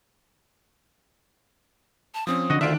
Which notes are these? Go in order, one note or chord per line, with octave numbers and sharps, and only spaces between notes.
A5
F3 C4 C#4 D#6
D3 F#4 D#5
D2 D3 D#3 D4 F4 E5 D7